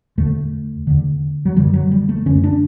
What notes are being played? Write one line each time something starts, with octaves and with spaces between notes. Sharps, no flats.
E2 D3 A3
E2 D3
F#3
F#2 D3 G3
F#3
G3
A3
F#2 D3 C#4
D4